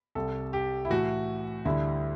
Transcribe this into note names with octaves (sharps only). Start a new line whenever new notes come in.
C2 C3 G3 A4
G4
E4
A2 E3 A3 F#4
D2 D3 G3 E4